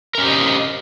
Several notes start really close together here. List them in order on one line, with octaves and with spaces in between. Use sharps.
A#4 C#4 G4 C5 D#5